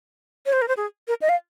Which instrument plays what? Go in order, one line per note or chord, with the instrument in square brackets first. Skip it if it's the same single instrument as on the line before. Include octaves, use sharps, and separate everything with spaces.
[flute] C#5
C5
A#4
C5
G#4
A#4
D#5
F5